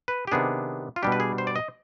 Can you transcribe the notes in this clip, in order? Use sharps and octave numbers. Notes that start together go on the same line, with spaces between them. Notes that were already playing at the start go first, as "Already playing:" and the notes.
B4
G4
C3 D#3 B3 D4 G#4
F4
B2 G3 D4 G4
B4
G#4
C5
D5
D#5